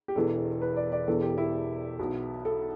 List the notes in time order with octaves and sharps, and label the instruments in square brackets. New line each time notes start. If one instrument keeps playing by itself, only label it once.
[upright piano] G4
E1 E2 E3 A4
B4
D5
D5
E1 E2 E3 A4
G4
E4
B1 B2
A4